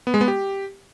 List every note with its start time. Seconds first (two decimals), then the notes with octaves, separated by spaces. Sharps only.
0.07 B3
0.14 G#3
0.21 B3
0.28 G4